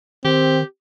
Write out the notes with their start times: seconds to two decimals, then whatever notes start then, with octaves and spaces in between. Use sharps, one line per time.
0.25 D#3 C4 G4